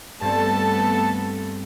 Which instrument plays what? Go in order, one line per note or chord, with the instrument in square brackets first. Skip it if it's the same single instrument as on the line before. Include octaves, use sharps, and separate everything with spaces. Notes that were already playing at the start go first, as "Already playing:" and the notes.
[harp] G2 C4 [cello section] A3 B3 A4 [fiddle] A5